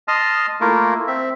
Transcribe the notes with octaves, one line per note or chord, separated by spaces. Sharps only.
D#5 A5 C6 D#6 F6
A3 A#3 E4 F4 A#4
C4 E5